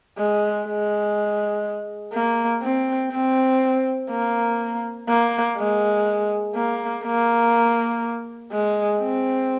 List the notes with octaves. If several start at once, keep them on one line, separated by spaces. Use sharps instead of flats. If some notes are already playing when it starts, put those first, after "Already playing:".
G#3
G#3
A#3
C4
C4
A#3
A#3
G#3
A#3
A#3
G#3
C4